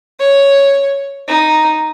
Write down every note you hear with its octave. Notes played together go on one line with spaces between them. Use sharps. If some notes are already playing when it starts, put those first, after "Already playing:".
C#5
D#4